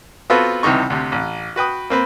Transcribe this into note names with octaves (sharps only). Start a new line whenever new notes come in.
B3 C4 F4 F#4 A4 B4
C#2 C3 E3 G3 D#4 C#6
D2 C3
A1
F#4 B4 G5 D#6
A#3 C4 B4